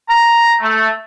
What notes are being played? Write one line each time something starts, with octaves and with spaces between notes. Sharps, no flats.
A#5
A3